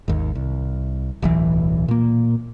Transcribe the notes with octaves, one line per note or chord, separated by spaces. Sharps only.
G#1 D#2
C2
D1 B1 E3
A#2 A#3